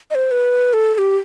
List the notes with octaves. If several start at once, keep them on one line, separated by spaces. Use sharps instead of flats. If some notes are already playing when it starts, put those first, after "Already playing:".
D#5
C5
B4
A4
A4
G4